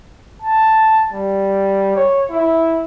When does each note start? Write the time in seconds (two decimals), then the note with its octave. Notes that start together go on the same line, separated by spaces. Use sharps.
0.42 A5
1.12 G3
1.96 C#5
2.30 E4